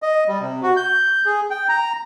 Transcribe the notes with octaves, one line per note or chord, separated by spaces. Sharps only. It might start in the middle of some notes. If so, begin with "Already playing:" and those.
D#5
G3
C3
F#4
G6
G#4
G5
A#5